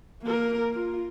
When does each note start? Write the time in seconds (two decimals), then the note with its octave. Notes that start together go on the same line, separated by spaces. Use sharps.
0.23 A#3 A#4
0.74 F4